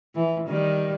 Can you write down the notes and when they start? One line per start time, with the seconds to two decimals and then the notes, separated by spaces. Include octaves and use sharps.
0.15 E3
0.48 D#3 G3